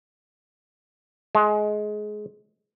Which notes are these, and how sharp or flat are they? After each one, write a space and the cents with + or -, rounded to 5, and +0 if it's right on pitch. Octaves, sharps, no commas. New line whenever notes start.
G#3 +20